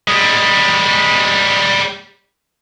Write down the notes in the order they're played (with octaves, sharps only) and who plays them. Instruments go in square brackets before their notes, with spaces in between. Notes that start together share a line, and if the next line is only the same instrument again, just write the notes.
[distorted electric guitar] G3 G#3